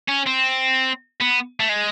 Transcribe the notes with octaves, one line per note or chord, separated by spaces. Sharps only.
C#4
C4
B3
A3
G#3